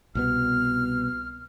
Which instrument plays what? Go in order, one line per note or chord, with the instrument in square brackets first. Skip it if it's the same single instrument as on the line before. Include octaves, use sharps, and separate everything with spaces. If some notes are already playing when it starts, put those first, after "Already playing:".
[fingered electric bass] C2 B2 B3 [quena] F6